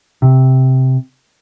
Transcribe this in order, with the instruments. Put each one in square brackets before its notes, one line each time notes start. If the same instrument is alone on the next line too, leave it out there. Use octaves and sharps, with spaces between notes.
[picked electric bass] C3